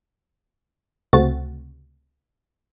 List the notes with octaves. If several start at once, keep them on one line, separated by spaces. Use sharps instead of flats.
C#2 C3 A3 C4 F#4 A6